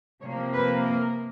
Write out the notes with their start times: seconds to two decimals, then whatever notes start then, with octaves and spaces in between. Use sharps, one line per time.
0.21 C3 F3 A#3 C#5
0.53 B4
0.84 A#4